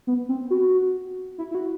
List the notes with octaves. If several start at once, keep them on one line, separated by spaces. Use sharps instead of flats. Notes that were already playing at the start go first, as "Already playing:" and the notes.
B3
C4
F#4
E4
E4
F#4